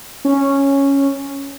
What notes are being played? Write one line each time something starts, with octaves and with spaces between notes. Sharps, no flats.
C#4